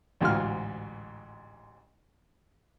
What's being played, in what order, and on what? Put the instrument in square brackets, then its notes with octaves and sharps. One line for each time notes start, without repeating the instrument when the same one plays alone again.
[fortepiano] A1 D2 G#2 F4 F#4 F6